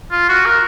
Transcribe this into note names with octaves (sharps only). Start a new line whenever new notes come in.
F4
F#4
A#4